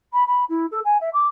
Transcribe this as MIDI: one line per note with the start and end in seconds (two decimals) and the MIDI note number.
0.13 0.23 83
0.27 0.44 83
0.49 0.66 64
0.71 0.80 69
0.85 0.97 80
1.00 1.09 76
1.13 1.27 86